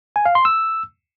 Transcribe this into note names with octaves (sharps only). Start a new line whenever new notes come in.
G#5
F5
C6
E6